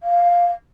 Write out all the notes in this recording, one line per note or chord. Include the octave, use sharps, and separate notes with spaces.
F5